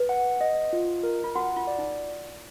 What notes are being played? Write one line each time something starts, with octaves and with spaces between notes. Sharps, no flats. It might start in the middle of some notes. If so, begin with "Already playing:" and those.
Already playing: B4
F#5
D#5
F4
A#4
F4
F#4 F#5
F4
D5
D#4